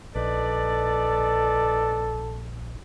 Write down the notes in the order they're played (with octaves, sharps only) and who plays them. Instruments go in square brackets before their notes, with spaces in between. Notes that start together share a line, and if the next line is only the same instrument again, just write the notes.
[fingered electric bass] A#1 [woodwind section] D#4 B4 D5 [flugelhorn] A4